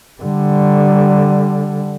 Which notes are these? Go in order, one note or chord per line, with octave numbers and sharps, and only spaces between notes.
D3 G3